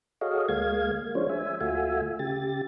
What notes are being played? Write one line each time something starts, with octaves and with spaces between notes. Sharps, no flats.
F#4 G#4 A4 C#5 D#5 F5
D2 G#3 A#3 F5 G#6
F3 G#3 C#4 D4 C5 C#5
E5 G#5
D2 A3 F4 F#4 E5 G#5
C#3 G4 A6